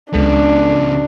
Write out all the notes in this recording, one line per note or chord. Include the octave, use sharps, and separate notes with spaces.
C#2 C#3 G#3 B3 D4 A4